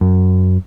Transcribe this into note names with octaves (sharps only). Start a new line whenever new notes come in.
F#2